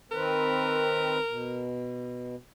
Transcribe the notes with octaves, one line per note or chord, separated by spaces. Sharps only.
D#3 C4 A#4 B4
B2